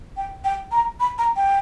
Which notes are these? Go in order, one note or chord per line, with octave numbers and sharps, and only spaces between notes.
G5
G5
A#5
B5
A#5
G5